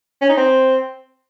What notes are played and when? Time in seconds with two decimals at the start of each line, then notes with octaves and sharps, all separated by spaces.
0.22 C#4
0.29 D#4
0.37 C4